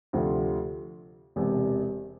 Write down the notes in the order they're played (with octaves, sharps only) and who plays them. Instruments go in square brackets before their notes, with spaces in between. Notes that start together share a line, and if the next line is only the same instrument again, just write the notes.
[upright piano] D2 C3 F3 C4
E1 E2 C3